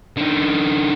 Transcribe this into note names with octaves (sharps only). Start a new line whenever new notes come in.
D3 D#4